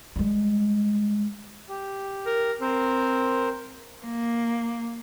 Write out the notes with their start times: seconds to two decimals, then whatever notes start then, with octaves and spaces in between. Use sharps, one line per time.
0.16 G3 G#3
1.69 G4
2.26 A#4
2.61 C4 A#4 C5
4.04 A#3